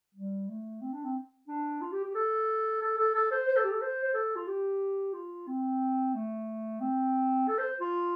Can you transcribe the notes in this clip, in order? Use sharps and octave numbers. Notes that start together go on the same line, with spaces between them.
G3
A3
C4
D4
C4
D4
F4
G4
G4
A4
A4
A4
A4
C5
C5
A4
G4
A4
C5
C5
A4
F4
G4
F4
C4
A3
C4
A4
C5
F4